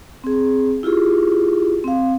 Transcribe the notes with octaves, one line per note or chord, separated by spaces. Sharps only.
C4 G#4
E4 F4 G4 G#4
C4 F5